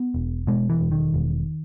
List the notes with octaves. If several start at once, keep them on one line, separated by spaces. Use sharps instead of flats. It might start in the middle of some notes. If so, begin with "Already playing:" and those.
Already playing: B3
E1
B2 G#3
E3
E1
D#3
E1